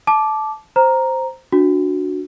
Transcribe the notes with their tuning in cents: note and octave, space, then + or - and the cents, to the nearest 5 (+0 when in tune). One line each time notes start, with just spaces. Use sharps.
A5 -20 D6 +0
C5 +0 A#5 +0
D4 +0 F#4 -15